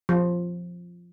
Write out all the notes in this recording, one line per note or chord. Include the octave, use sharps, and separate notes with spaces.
F3